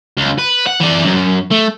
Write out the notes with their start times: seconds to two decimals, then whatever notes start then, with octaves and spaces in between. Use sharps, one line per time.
0.17 C#2
0.39 B4
0.67 F#5
0.81 E3 D5
1.05 F#2
1.51 A3